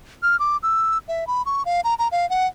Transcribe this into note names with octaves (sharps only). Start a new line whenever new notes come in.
F6
D6
E6
E5
B5
C#6
F5
A#5
A#5
F5
F#5